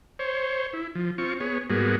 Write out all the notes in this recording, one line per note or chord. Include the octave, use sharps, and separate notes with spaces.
C5 C#5
E4
F3
C4 F4 C#6
B3 G#4 C#5
G#2 G3 A#3 B3 F#4 G#4